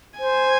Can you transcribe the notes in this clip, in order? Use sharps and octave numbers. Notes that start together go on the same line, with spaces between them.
C5 G#5